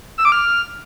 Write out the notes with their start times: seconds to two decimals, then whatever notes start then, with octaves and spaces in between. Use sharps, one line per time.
0.18 E6
0.25 D6
0.32 F6